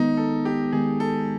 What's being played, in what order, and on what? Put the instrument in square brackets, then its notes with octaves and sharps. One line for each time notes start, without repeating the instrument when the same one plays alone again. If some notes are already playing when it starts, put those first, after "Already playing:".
Already playing: [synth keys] D#3 G#3 B3 [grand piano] D#4
[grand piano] A4
G4
[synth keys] D#3 G#3 B3 [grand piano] G#4
[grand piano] A4